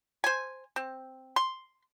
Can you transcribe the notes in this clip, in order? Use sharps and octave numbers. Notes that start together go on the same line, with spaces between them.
C5 G#5
C4
C6